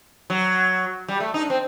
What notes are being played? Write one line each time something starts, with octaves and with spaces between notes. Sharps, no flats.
F#3
G3
A3
D#4
D4
C4